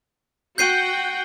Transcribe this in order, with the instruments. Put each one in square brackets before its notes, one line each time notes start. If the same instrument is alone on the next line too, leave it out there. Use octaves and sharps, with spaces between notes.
[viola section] F#4 F#5 G5 [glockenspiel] G6 C7 D#7